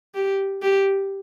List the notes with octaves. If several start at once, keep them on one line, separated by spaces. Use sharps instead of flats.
G4
G4